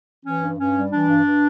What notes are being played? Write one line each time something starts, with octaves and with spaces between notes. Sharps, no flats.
E3 C#4
G2
G2 C#4
G3
E3 D4
G2
G2